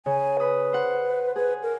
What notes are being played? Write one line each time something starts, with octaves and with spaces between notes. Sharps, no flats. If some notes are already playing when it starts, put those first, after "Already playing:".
C#3 G#5
B4 B5 D#6
C5 F#5
G#4 B4
A#4